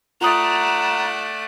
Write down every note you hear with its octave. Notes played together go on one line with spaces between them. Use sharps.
A3 F4 D5 F#5 A#5 D#6 F#6